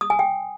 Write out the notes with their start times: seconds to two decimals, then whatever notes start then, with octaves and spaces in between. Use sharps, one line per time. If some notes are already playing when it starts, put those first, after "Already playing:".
0.01 D#6
0.10 G#5
0.19 G5